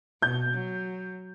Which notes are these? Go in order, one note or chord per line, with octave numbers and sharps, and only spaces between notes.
B2 G6
F#3